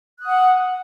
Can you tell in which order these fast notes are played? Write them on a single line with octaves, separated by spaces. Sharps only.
F#6 D#6 F#5 F6